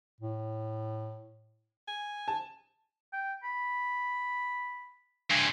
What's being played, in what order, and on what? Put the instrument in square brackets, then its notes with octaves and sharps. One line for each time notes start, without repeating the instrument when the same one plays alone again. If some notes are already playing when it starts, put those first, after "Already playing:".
[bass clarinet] A2
[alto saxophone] G#5
[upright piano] A5
[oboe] G5
B5
[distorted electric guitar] G2 C3 [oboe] G#5